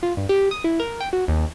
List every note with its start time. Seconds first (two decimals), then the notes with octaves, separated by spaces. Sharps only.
0.03 F4
0.17 G2
0.29 G4
0.51 D#6
0.64 E4
0.80 A#4
1.00 G5
1.13 F#4
1.28 D#2